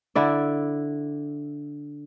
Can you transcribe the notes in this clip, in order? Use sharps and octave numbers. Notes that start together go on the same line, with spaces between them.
D3 E4 D5